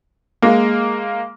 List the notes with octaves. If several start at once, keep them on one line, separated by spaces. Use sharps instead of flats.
G#3 A#3